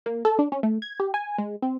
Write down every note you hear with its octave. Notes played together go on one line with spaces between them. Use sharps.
A#3
A4
D4
C#4
A3
G#6
G4
G#5
G#3
C4